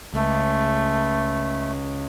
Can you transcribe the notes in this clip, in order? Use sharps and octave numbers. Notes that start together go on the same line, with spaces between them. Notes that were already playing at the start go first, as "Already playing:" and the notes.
C#2 A3